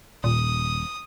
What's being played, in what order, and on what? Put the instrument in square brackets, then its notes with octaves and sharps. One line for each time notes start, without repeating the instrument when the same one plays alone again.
[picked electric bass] D#1 [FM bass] A#2 [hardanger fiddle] D#6